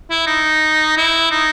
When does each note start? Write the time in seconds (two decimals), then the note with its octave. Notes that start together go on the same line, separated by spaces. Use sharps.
0.10 E4
0.27 D#4
0.97 E4
1.31 D#4